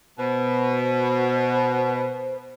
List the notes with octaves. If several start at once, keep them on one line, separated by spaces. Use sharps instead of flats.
B2 C5